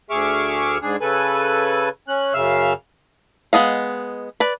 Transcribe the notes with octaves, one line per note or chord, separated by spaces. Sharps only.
D2 G#4 E5 C#6 D6 F6
G#2 D4 G#4
C#3 A4 B4 G#5
C#4 F#6
F#2 C#3 E5 F5 E6 F6
G#3 B3 D#5 F5
B4 D5